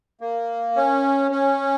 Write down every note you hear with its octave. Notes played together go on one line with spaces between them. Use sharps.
A#3
C#4
C#4